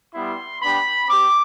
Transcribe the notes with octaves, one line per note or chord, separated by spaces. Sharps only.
G3 B3 E4 C6
B3 D4 G4 B5
C4 G4 D6